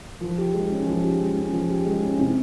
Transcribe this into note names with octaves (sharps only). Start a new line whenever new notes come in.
F3
G4
G#3
C#4
F3
G4
G#3
C#4
F3
G4
G#3
C#4
C3